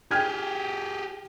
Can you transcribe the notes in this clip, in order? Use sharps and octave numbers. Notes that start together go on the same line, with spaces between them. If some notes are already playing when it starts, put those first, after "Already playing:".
G4 G#4 G5 F6 G#6